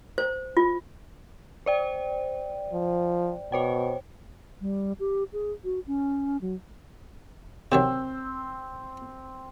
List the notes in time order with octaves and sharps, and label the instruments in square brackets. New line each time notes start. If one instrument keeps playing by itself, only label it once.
[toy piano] C5
F4
[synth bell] C5 D5 G5
[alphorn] F3
[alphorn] B2 [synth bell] C5 C#5 G5
[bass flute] G3
G4
G#4
F#4
C#4
F#3
[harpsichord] C3 D#3 F#3 [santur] C4